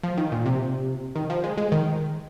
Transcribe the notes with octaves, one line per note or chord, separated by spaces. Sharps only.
F3
D#3
A#2
C3
D#3
F3
G#3
G#3
D#3